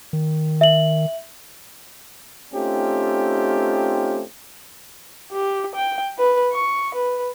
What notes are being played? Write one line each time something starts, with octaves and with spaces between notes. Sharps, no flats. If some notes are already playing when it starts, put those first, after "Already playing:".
D#3
E5 F#7
A3 C4 C#4 D#4 F4 G4
G4
G5
B4
C#6
B4